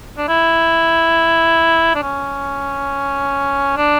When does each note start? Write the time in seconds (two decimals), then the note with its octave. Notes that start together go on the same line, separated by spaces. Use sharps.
0.18 D4
0.28 E4
1.95 D4
2.03 C#4
3.77 D4